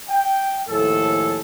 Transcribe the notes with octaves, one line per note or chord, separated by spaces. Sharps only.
G5
D#2 A2 F3 G#4 A4